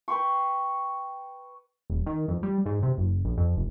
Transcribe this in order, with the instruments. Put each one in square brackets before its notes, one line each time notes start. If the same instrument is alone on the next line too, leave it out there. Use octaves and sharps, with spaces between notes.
[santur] B4 G5 C6 C#6
[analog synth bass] D#1
D#3
F2
G3
G#2
C3
F#1
A#1
F2
F1